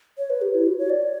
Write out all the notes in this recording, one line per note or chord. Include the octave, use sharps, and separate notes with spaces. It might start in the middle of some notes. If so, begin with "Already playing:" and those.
C#5
B4
G4
E4
F#4
C#5
D5
C#5